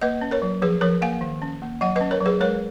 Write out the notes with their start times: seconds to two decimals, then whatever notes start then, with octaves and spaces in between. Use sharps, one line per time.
0.01 A#3 B4 D#5
0.21 C#4
0.31 A#4 C#5
0.42 F#3
0.62 F3 G#4 B4
0.81 F3 A#4 C#5
1.02 A#3 F5 G#5
1.21 D#3
1.42 C#4
1.62 A#3
1.81 F#3 D#5 F#5
1.96 C#4 B4 D#5
2.11 A#4 C#5
2.21 F#3
2.26 G#4 B4
2.41 G#3 A#4 C#5